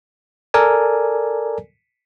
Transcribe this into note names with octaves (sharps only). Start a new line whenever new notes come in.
A4 A#4 D5 G#5